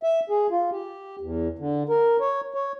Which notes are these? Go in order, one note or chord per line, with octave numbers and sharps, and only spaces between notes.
E5
G#4
F4
G4
E2
D3
A#4
C#5
C#5